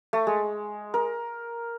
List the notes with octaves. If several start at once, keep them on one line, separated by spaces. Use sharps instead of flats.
A3
G#3
A#4